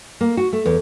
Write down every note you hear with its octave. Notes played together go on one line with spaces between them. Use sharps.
A#3
F#4
A3
E2